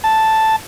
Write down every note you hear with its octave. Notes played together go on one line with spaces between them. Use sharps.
A5